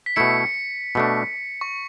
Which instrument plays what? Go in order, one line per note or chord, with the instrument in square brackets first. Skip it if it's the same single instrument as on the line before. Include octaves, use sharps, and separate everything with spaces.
[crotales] B6
[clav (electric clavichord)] B2 A3 E4 [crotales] C#7
[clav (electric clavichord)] B2 A3 D4
[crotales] C#6